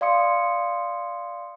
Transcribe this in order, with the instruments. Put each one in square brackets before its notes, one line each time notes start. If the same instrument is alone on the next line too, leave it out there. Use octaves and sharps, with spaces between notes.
[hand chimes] D5 F5 C6 D#6 C#7